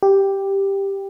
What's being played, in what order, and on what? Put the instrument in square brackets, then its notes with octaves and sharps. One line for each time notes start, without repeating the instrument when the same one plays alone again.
[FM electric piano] G4